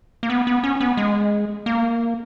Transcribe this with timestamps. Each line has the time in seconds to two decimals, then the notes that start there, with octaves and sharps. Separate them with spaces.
0.23 A#3
0.30 B3
0.47 B3
0.64 C#4
0.80 B3
0.97 G#3
1.66 A#3